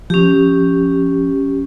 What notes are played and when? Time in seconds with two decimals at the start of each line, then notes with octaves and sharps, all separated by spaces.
0.10 F3 C#4 G4